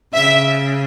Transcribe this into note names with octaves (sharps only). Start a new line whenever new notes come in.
C#3 E5